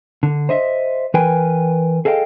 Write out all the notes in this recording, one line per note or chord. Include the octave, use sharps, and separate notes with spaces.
D3
C5 D#5 E5
E3 A#4 B4 G5 G#5
G#4 A4 D#5 F5 G5